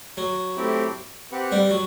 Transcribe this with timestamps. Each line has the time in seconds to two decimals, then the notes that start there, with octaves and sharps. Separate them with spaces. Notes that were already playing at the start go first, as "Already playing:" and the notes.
0.17 F#3
0.56 A3 C4 E4 G4
1.32 C4 G4 B4 F#5
1.52 G3
1.70 F#3